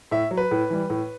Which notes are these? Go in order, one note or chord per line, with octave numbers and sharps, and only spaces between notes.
A2 E5
F#3
B4
A2
E3 G3
A2